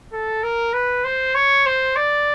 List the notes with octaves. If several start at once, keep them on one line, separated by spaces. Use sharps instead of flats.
A4
A#4
B4
C5
C#5
C5
D5